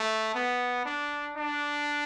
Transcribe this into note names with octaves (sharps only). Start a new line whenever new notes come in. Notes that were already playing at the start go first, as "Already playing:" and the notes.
Already playing: A3
B3
D4
D4